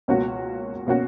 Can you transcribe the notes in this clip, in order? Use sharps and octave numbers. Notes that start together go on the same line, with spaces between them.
C#2 B2 A#3 C#4 F#4
B2 A#3 C#4 F#4